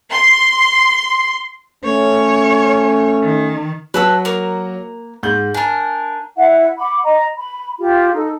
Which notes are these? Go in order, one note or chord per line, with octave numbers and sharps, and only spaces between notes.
C6
A3 C#4 C#5
D#3
F#3 F#4 B4 A5 E6
A#3 A#4
G#2 G6 F#7
D4 A#4 G#5
E4 E5 F#5
F#5 B5 D6
D#5 A#5
B5
F4 G4
D#4 A4